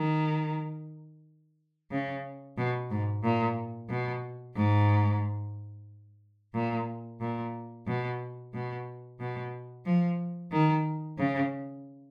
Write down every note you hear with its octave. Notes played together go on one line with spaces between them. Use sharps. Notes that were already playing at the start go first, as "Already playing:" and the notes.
Already playing: D#3
C#3
B2
G#2
A#2
B2
G#2
A#2
A#2
B2
B2
B2
F3
D#3
C#3